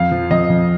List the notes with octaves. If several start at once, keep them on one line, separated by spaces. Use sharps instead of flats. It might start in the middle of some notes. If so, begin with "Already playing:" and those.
Already playing: F2 F5
F3
F2 D#5
F2